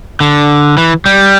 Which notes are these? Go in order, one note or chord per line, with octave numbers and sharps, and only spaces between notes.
D3
E3
G3